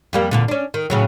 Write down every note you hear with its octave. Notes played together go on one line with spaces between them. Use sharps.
F2 G3 A#3
E2 A#2 D3
C#4 D4
D#3
A2 C#3 F#3